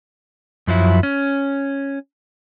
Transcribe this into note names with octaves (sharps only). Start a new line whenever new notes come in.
F#2 F3 F#3 E4
C#4